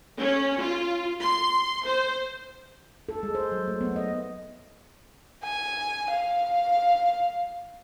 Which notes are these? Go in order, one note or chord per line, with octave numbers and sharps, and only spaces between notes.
C#4
F4
C6
C5
A4
G#3
C5
F#3
A3
B3
D#5
G#5
F5